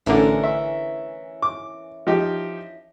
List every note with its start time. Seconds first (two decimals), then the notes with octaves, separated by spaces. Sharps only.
0.06 A1 D3 E3 C#4 A#4
0.44 E5
1.42 D6
2.07 F3 D#4 G4